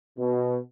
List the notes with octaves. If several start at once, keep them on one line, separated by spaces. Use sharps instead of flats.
B2